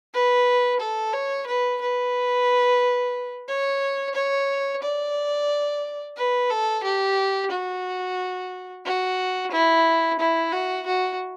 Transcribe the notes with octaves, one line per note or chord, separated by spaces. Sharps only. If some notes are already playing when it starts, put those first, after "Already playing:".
B4
A4
C#5
B4
B4
C#5
C#5
D5
B4
A4
G4
F#4
F#4
E4
E4
F#4
F#4